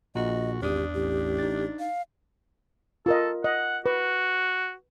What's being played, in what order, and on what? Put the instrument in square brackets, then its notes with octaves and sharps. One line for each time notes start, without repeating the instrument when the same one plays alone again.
[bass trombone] A#1 [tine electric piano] A#2 [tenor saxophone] F#4 [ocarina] D#5
[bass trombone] G#1 [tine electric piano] E2 D#6 [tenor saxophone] D4 [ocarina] G4
[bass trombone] A1 [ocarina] G4
[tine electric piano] D#4 A6
[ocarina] F5
[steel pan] F4 A#4 D#5 [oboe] A4
[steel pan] D#5 [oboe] F#5
[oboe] F#4 [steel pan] B4